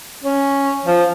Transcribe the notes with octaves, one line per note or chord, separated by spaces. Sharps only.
C#4
F3